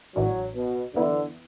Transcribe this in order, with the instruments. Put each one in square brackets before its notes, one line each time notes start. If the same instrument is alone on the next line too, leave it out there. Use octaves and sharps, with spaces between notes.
[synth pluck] A1 A2 E3 D4 [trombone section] F#3
[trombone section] B2
[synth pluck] F#2 E3 B3 E4 [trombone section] D3